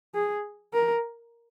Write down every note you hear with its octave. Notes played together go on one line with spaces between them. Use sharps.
G#4
A#4